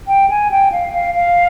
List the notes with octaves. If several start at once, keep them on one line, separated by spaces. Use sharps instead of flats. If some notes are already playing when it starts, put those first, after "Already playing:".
G5
G#5
G5
F5
F5
F5